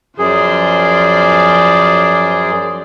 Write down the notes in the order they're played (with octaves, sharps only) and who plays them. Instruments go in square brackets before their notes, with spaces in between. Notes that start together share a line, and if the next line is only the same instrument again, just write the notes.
[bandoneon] F#2 G#4 [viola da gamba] F3 C5 D5